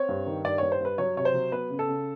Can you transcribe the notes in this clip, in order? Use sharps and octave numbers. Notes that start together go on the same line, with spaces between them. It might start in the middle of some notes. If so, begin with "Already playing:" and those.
Already playing: C4 C#5
G2
D#3
G2 D5
G2 C#5
C5
G2 B4
F#3 C#5
C3 C#5
C5
F#3
B3 B4
C#3
A4
C#3